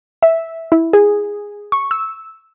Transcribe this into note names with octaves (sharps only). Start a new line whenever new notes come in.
E5
E4
G#4
C#6
E6